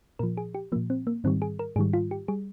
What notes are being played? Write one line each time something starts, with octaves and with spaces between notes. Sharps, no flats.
A#2 F3 A#4
G#4
G4
A#2 F3 A#3
C4
A#3
G#2 D#3 G3 C4
G#4
A#4
G#2 D#3 G3 G#4
F4
G4
G3 G#4